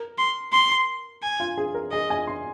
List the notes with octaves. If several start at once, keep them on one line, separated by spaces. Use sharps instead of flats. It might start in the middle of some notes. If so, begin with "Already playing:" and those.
Already playing: A#4
C6
C6
G#5
F4
G#4
A#4
G#4 D#5
G#5
C6